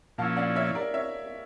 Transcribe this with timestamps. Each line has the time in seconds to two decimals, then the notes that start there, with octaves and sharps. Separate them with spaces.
0.18 A#2 F3 C#4 E4 F5 A5
0.36 D5 F5
0.55 C#5 E5
0.75 A#4 D5
0.94 C#5 E5